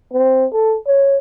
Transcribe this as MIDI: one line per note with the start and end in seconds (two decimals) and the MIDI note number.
0.13 0.46 60
0.53 0.77 69
0.87 1.17 73